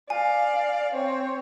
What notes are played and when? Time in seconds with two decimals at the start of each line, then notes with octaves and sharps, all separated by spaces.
0.10 D5 F5 G#5
0.94 C4 C#5